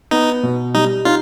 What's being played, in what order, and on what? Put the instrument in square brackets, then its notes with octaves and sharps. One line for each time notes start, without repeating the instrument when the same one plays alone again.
[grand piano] B3 [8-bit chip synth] D#4
[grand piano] B2
[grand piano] G3 [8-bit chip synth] D#4
[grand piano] D#4 [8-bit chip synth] F4